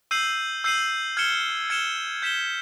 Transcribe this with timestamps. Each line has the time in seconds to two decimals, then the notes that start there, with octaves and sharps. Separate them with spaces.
0.11 E6 G6 C7 D#7 F#7
0.64 E6 G6 C7 D#7 F#7
1.17 F6 G#6 C#7 E7 G7
1.70 F6 G#6 C#7 E7 G7
2.22 G6 B6 E7 G7